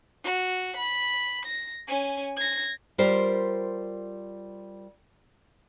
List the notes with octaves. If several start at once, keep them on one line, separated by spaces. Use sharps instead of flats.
F#4
B5
A#6
C#4 G#5
G#6 A#6
G3 F4 G4 A#4 C5